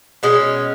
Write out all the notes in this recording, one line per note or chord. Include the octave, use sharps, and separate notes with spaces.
B2 G#3 C#4